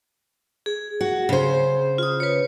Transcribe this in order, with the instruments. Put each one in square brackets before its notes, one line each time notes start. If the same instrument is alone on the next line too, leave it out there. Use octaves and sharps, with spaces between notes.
[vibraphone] G#4
[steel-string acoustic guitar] F#4
C#3 C5
[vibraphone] F4 D#6
B4 C#5